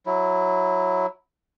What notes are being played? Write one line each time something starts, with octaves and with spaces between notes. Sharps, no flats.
F#3 E4